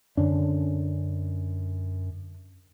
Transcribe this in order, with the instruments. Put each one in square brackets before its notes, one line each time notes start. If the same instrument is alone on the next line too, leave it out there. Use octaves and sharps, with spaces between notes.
[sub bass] F#2 [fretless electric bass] D3 C#4 D4